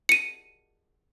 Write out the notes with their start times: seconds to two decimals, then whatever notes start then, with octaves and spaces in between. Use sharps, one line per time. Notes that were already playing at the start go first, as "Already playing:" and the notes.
0.09 C#7 D#7